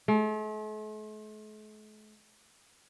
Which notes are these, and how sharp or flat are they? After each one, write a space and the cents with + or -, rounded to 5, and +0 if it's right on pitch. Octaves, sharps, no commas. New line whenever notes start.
A3 -45